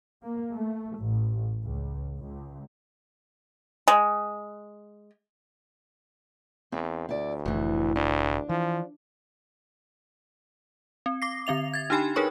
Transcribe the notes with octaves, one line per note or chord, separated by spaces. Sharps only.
A#3
A3
A1
C#2
C#2
G#3
E2 C4
D2 E4 D5
F1 A2 E3
D2 D4
E3 F3
C4
D6 A#6 C7
D3 C4 E5 F7
G#6 A6
D4 D#4 G4 G5 G#5 B5
D#4 G#4 A#4 B4 C#5 C#6